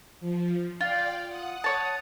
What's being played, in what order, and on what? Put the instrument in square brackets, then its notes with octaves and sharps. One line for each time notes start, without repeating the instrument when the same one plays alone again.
[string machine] F3
[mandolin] F4 [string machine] D5 F5 G5
[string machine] F#5 D#6
[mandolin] C#5 A5